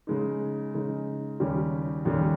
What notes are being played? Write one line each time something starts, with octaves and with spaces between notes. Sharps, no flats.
C#3 G#3 D#4
C#3 G#3 D#4
D#2 C#3 G3 C#4 G4
D#2 C#3 G3 C#4 G4